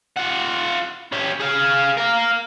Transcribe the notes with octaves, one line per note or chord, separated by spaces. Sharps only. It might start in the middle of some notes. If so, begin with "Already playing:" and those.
F4 F#5
C#4 G4
G#4 F5
A#4 F5